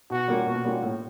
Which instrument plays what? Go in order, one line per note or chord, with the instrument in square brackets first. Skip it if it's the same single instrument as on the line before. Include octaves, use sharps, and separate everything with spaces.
[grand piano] B2 [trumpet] F#4
[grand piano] G3 A#3 C#4 F4
[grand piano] B2 [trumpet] F#4
[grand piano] G3 A#3 C#4 F4
A2